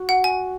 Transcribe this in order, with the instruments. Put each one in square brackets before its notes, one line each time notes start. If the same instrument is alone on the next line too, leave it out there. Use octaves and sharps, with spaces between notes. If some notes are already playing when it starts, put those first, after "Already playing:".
Already playing: [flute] F#4
[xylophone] F#5
G#5